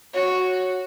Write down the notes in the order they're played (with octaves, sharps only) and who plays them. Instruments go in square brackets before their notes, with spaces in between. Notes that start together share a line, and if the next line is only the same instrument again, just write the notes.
[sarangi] F#4 [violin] C#5